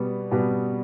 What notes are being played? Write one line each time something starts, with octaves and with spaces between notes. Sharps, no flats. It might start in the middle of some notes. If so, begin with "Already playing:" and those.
Already playing: B2 G3 B3
B2 G3 B3